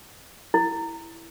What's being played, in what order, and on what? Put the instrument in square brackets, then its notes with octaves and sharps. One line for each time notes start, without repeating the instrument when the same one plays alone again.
[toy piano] E4